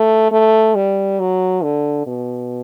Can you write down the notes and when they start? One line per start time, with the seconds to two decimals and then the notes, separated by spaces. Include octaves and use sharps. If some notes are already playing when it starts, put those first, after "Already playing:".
Already playing: A3
0.31 A3
0.75 G3
1.20 F#3
1.63 D3
2.07 B2